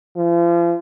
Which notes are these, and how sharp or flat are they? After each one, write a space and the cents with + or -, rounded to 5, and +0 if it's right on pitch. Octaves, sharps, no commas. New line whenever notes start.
F3 -40